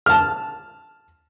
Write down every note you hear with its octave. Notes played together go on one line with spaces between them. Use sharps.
A5 F6